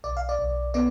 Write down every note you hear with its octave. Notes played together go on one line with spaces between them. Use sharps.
B1 D5
F5
D5
B1
B3 D5